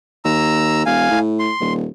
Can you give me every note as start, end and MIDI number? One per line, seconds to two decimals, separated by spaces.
0.25 0.82 39
0.25 0.83 82
0.25 0.83 88
0.86 1.10 28
0.86 1.19 77
0.86 1.19 80
1.11 1.49 45
1.39 1.73 84
1.60 1.87 27